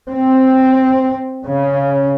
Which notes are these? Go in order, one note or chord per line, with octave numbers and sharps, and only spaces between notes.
C4
C#3